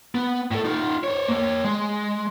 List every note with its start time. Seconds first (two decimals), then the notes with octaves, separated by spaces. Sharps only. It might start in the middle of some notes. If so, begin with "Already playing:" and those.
0.15 B3
0.51 A2 A4
0.65 D#4 F4
1.04 C5 C#5
1.28 A#3 C#5
1.65 G#3